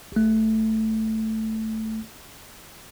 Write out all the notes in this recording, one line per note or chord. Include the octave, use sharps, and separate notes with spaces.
A1 A3